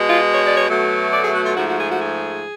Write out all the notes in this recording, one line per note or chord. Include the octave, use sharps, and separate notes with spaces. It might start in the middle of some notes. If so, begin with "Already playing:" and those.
Already playing: B2 G#3
F4
C#5
D5
C#5
B2 F#3 A3
D5
G#4
F#4
F4
G#2 F3 A3 F#4
F#4
G#4
F#4
G#4